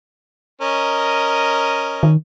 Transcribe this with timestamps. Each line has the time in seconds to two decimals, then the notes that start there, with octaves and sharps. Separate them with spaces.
0.62 C#4 A#4 D#5
2.03 D#3